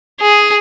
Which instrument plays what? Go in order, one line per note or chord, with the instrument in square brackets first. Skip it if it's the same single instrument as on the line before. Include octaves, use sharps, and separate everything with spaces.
[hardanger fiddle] G#4